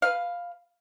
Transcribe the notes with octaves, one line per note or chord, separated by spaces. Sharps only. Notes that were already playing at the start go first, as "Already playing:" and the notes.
B4 F5